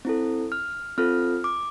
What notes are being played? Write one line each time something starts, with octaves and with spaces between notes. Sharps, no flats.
C4 E4 A4
F6
C4 F4 A4 F6
D6